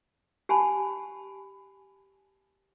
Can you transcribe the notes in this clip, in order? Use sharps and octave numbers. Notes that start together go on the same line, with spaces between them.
G4 G#5 A5 B5